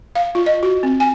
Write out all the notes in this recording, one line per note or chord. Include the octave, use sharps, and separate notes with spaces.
F5
F4
D#5
F#4
C4
G#5